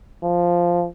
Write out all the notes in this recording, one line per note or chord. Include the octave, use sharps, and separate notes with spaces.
F3